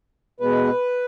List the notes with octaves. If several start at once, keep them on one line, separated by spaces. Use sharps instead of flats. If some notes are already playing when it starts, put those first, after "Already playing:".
B2 G#3 B3 B4